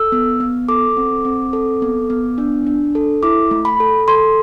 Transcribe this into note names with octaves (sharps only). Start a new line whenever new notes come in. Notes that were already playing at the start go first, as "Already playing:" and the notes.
Already playing: A4 E6
B3
B3
A4 D6
C4
C4
A4
B3
B3
D4
D4
A4
E4 D6
A3
B5
A4
A4 C6